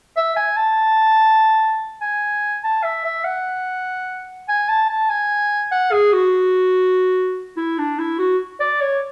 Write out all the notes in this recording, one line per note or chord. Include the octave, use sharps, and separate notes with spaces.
E5
G#5
A5
G#5
A5
E5
E5
F#5
G#5
A5
A5
G#5
F#5
G#4
F#4
E4
D4
E4
F#4
D5
C#5